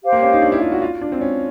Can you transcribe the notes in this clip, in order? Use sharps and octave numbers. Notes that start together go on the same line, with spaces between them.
G4 C5 F5
A#3
C#4
D#4
D4
E4
F4
F#4
F4
D4
C4
C#4